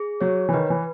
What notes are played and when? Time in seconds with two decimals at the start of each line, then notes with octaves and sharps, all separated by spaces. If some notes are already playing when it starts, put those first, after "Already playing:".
Already playing: G#4
0.21 F#3 C#5
0.49 E3
0.53 D#3 B4
0.70 E3